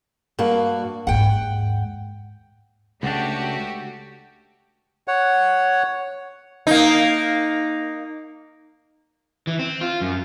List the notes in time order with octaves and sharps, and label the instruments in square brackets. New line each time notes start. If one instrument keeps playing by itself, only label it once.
[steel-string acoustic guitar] G2 A#3 F#4
[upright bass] D#2 G#2 [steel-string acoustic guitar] F#5 G5
[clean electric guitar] C#2 D4 [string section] A3 F#4 G4
[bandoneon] C#5 F#5
[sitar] A#3 D#4
[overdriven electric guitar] E3
C4
F4
F#2